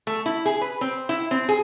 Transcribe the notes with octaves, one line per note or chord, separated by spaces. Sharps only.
A3
E4
G#4
B4
C4
E4
C4
G#4